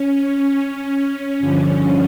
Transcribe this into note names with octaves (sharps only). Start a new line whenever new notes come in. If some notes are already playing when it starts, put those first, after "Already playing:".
Already playing: C#4
G2 D3 F3